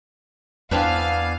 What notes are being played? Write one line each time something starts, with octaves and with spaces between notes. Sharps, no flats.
E2 B3 C4 D4 B4 D5 F5 G#5